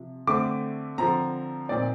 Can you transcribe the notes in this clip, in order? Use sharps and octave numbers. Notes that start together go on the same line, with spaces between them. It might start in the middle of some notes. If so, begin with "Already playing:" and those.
Already playing: C3 F3
D3 A3 C4 D6
D3 F3 C4 A#5
A#2 F3 C4 D#4 D5